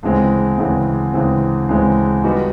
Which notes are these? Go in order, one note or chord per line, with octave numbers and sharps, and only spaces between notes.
D2 C#3 E3 G#3 C4
D2 C#3 E3 G#3 C4
D2 C#3 E3 G#3 C4
D2 C#3 E3 G#3 C4
G3 B3 D#4 F#4